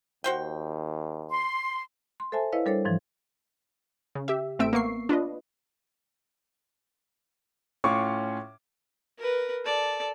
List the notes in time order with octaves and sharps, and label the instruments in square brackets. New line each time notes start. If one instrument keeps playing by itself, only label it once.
[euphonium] D#2 [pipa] F#4 C5 G5
[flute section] C6
[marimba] C6
A4 C5 E5 G#5 A5
E4 B4 C#5 D#5 F5
G3 D4 A4 A#4 C5 C#5
G#2 E3 F3
[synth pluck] C#3
G4 E5
A1 A3 C4 E5 E6 D7
A#3 B3 C#6 C7
D4 F4 B4 D#5
[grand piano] A2 C#4 F4 F5 C#6 D6
[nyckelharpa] A#4 B4
A4 D5